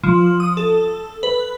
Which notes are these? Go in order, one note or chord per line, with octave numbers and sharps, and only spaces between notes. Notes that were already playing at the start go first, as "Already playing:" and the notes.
F3
D#6
A4
B4